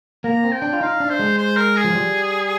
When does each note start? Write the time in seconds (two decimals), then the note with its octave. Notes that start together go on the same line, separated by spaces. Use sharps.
0.24 A#3 A#5
0.43 C4
0.52 G5
0.62 D4
0.73 F4
0.81 D#4 F5
1.00 D4
1.10 C5
1.19 G#3
1.38 C5
1.57 A#4
1.77 G#4
1.84 F3
1.95 G3